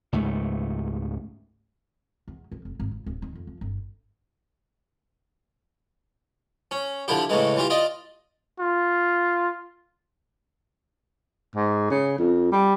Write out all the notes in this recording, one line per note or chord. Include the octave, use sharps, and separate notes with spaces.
C#2 G#2 A3
E2
F2
F1
G#1
C#2
D1
D#3
F2
F3
G1
C#4
D3 F3 E4 G4
A2 C#3 E3 G#3
E3 F4 G4
F4 D5 D#5
F4
G#2
C#3
F2
G3